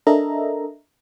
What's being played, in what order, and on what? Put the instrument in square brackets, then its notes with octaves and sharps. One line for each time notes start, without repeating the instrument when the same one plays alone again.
[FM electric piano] D4 A4 A#4 D#5 E5 A#5